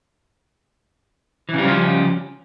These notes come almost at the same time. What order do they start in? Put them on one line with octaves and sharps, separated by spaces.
E3 C#3 G3 F3 C#4